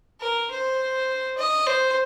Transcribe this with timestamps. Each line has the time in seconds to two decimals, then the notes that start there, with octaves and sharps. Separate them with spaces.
0.20 A#4
0.50 C5
1.38 D#5
1.67 C5